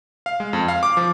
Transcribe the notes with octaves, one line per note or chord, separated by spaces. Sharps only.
F5
G#3
F2
F5
D6
F3